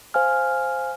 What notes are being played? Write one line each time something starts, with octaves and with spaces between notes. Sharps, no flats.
C5 F5 G#5 F6